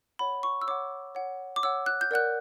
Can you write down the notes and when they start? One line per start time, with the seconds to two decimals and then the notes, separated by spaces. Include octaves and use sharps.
0.19 C#5 F#5 B5
0.43 C#6
0.62 E6
0.67 C#5 F#5 D6
1.15 C#5 F#5
1.56 D6
1.63 C#5 F#5 E6
1.86 F#6
2.01 G6
2.11 A#4 D5 F#5 F#6